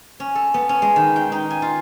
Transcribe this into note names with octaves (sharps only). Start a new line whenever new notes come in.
C#4
A4
B3
C#4
G#3
D#3
G5
D#4
G#5
F4